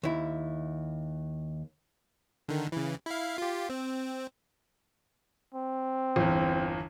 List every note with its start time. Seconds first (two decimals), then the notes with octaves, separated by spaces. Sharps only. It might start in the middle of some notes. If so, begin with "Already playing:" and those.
0.03 D#2 E4
2.49 D3 D#3
2.72 C#3 E3
3.06 E4 F5
3.38 F4 G4
3.70 C4
5.54 C4
6.16 G1 E2